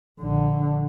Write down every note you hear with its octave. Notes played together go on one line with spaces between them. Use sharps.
A#1 D3